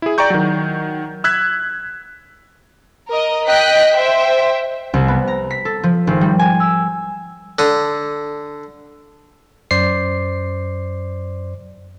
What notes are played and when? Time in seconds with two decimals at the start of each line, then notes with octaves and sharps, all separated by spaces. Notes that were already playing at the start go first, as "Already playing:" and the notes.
0.02 E4 G#4
0.18 D5 G5 A#5 C#6 G6
0.30 D#3 F#3
1.24 E6 F#6 G#6 B6
3.09 A#4 D#5
3.46 D#5 G5 F#6 B6
3.95 C5 E5 G5
4.94 C2
5.08 B3
5.27 A#5
5.51 B6
5.65 A4
5.83 F3
6.07 G#1
6.21 G3
6.39 G#5
6.60 E6
7.59 D3 D#6
9.71 F#2 C5 D5 C7